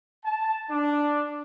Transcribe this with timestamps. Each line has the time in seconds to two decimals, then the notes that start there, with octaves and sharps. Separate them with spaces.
0.24 A5
0.69 D4